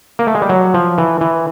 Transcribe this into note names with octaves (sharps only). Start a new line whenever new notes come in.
A#3
A3
G#3
G3
F#3
F3
E3
E3